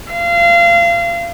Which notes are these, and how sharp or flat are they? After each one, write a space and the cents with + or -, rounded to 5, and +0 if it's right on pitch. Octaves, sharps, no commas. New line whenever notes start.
F5 -30